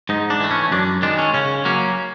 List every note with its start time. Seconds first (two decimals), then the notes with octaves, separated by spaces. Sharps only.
0.09 G#2 D#4
0.30 D4
0.40 E3 A3
0.51 C#4
0.72 F#2 D4
1.02 D#3 G#3 D4
1.18 C#4
1.34 C#3 C#4
1.65 F#3 A#3 C#4